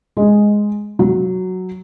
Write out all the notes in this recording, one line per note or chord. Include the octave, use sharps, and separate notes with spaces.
G#3
F#3